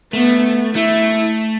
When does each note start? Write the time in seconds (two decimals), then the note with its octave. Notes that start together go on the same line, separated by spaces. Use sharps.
0.13 A3 B3
0.75 A3 E4